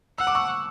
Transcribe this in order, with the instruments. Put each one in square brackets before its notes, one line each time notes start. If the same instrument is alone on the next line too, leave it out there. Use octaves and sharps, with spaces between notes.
[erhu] F#5 [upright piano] E6
[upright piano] D6
C#6 E6